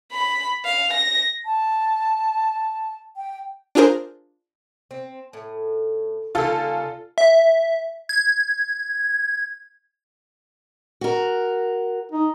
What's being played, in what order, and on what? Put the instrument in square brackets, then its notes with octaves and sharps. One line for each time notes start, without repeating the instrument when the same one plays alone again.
[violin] B5
F5
A#6
[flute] A5
G5
[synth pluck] D4 F4 G#4 A#4 C5
[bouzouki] C4
A2
[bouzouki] C#3 G3 A#3 [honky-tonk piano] F4 A4
[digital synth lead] E5
G#6
[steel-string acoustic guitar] F#4 A#4
[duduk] D#4